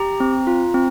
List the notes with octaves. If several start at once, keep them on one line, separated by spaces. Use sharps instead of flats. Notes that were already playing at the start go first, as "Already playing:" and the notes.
Already playing: G4 A#5
C4
F4
C4